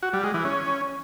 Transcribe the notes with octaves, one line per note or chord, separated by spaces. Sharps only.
F#4
G3
G#3
E3
C#4